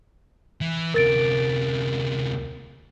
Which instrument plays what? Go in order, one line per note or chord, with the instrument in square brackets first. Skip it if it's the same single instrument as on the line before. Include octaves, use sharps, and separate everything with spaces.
[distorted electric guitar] E3
[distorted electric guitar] D2 C3 [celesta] A#4 A6 D7